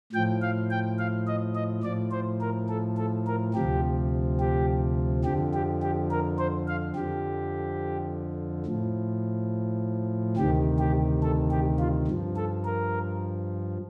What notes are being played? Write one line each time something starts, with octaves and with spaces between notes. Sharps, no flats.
A2 F3 G5
F5
G5
F5
D#5
D#5
A2 F3 D5
C5
A#4
A4
A4
A#4
D2 C3 F3 G4
G4
F2 D3 F3 G4
G4
G4
A#4
C5
F5
F2 D3 F3 G4
A2 F3
D2 C3 D#3 G4
G4
A4
G4
F4
G2 F3
A4
A#4